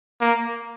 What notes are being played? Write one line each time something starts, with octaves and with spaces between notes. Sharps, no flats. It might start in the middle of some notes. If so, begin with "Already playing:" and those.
A#3